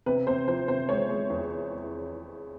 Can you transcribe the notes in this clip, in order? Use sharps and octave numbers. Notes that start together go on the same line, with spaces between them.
C3 B4
C3 C5
F3 C5
C3 C5
G#3 C#5
G#3
E2